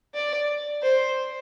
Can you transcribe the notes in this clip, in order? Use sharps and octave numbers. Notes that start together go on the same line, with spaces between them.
D5
C5